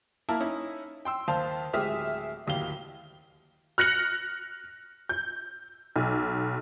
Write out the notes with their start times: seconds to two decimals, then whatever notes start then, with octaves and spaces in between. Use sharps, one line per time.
0.29 A#3 E4 A#4 A5
0.40 C#4 D#4 E4
1.05 G5 C6 E6
1.28 D#2 C5 F5 A5
1.73 D1 G#3 G4 E5 D#6 F6
2.47 D1 D#2 G4 F5 G7
3.78 F6 F#6 A#6 C#7 F#7
5.09 G6
5.96 B1